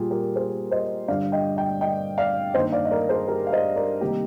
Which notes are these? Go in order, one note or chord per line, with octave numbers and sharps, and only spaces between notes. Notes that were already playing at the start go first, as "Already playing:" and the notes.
Already playing: A#2 G3 A#3 F4 G4 G#4
G4 A#4
G#4 C5
C5 D#5
G2 D3 G3 D5 F5
D#5 G5
D#5 G5
D#5 G5
D5 F5
G2 D#3 A#3 C5 D#5
D5 F5
D#5
A#4 D5
G#4 C5
G4 A#4
F5
C5 D#5
A#4 D5
C3 D#3 G3 A#3 D#4 G4